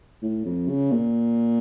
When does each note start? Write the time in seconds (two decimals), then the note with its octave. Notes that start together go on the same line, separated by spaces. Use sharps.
0.22 A2
0.46 F2
0.68 C#3
0.91 A#2